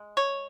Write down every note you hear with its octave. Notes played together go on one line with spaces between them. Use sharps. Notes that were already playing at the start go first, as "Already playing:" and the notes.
Already playing: G#3
C#5